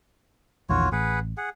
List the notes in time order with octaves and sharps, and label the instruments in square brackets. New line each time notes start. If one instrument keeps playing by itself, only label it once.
[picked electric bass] A#1 E2 D#3 [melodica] F4 F#4 C#5
[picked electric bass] A1 [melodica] G#4 B4 F#5
[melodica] G#4 F#5